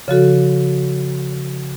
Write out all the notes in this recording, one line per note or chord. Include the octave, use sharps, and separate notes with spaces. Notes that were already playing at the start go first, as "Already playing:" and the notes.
C#3 F3 F#4 A4